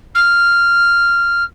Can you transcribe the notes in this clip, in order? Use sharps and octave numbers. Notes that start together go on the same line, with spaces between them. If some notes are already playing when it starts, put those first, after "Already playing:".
F6